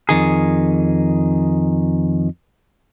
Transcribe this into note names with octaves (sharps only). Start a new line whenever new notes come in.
F2 D#3 G#4